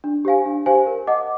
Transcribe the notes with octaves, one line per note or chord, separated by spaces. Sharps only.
D4
G4 C5 F5 G#5
D4
G4 C5 F5 G#5
A#4
D#5 F#5 A5 D6